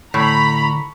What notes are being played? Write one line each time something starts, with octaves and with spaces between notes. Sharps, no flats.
A2 D3 A#5 B5 C#6